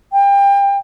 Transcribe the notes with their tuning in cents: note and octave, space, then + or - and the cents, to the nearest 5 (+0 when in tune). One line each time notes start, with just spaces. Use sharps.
G5 +30